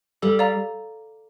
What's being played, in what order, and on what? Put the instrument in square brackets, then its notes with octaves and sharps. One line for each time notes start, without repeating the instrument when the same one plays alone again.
[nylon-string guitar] G3 [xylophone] A4
[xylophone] D5 F5 A#5